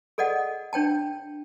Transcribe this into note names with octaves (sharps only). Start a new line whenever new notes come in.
G#4 A4 D5 D#5 F#5
D4 C#5 G5 A5